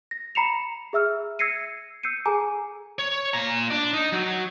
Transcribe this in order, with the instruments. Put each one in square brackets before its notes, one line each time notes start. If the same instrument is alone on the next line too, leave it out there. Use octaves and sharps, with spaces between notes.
[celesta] A#6
A#5 B5 C7 C#7 E7 F7
G#4 E5 E6 F6
E6 G#6 A#6 C7 C#7 D#7
E6 G6 C7 C#7 D#7
G#4 A4 G#5 A#5 D6
[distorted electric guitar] C#5
A#2 A#5
D4 D5
D#4
F#3